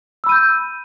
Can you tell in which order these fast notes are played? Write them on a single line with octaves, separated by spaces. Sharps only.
E6 B5 D#7 G6